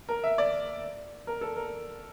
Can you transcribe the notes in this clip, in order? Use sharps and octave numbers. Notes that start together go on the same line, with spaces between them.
A#4
E5
D5
A#4
A4
A#4